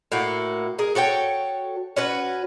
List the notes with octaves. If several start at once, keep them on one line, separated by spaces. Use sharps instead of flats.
A2 A#3 F#4
G#4 A#4
F#4 A4 C#5 G5
C#4 F#4 B4